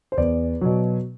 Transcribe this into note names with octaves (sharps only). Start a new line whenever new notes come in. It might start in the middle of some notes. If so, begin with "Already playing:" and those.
C5
E2 D5
B2 F#3